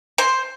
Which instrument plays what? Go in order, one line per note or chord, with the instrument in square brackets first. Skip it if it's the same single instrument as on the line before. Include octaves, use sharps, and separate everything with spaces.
[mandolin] C5